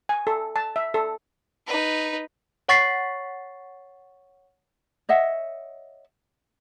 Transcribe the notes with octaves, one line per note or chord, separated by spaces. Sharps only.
G#5
A4
A5
E5
A4
D#4 B4
C#5 F#5 C#6 A6 B6 C7
C#5 D#5 E5 F#5